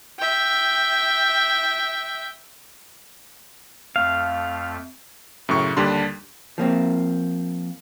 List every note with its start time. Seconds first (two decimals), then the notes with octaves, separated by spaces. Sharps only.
0.19 E5 G5
3.96 F2 A3 F5
5.49 F#2 A2 C#3 C#6
5.77 D#2 D3 G3 D4 C6
6.58 F3 A#3 C4